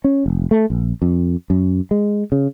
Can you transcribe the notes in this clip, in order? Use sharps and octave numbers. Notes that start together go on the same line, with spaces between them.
C#4
F1
A3
A#1
F2
F#2
G#3
C#3